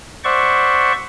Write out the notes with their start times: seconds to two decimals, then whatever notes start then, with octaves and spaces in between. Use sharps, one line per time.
0.24 C5 D5 E5 F#5 C#6